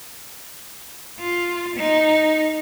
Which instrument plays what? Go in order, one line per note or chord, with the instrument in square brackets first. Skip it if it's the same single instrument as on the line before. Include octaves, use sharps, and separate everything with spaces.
[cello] F4
D#4